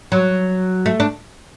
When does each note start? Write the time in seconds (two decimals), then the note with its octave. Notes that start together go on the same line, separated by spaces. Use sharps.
0.12 F#3
0.86 A3
1.00 D4